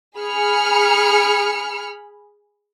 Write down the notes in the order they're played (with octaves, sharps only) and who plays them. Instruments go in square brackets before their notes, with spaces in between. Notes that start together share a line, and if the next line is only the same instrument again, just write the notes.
[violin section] G#4 B5 F6 C#7